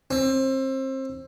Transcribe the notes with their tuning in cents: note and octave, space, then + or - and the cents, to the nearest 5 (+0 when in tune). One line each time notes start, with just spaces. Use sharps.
C4 +25